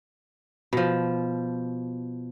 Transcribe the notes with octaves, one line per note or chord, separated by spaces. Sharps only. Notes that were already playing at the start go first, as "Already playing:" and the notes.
B2 F3